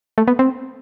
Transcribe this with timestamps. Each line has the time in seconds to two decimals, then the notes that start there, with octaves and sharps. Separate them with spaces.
0.18 A3
0.28 B3
0.39 C4